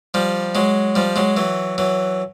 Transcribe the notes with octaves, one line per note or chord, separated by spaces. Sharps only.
F3 G3
F#3 G#3
F3 G3
F#3 G#3
E3 F#3
E3 F#3